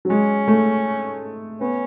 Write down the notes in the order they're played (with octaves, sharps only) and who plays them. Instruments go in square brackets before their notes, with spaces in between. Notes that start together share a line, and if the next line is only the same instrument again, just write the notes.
[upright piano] F#3
[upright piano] G#3 [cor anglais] C#4
[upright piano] A3
[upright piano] B3 [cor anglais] C#4